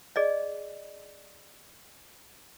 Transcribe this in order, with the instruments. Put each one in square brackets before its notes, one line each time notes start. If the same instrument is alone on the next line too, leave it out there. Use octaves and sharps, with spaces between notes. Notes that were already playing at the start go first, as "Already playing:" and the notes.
[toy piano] G#4 D5 D#5